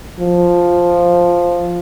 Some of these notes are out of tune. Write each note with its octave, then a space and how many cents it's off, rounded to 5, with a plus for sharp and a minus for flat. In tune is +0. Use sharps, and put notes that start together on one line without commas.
F3 +0